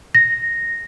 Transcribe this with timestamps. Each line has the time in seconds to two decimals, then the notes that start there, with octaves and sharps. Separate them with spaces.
0.15 A#6